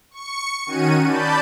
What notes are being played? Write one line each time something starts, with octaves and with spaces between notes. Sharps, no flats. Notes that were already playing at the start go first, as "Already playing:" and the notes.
C#6 C#7
D#3 C#4 F#4 D#7
D5 A5 B5 G6